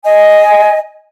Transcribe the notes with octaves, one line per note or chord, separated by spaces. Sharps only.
D#5 G#5